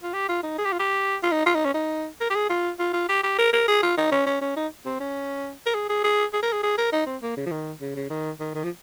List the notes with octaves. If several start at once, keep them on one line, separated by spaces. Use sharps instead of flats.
F4
G4
F4
D#4
G#4
G4
F4
G4
F4
D#4
F4
D#4
C#4
D#4
A#4
G4
G#4
F4
F4
F4
G4
G4
A#4
A#4
G#4
F4
D#4
C#4
C#4
C#4
D#4
C4
C#4
A#4
G#4
G#4
G#4
G#4
A#4
G#4
G#4
A#4
D#4
C4
A#3
C#3
F3
D#3
C#3
C#3
D#3
D#3
D#3
F3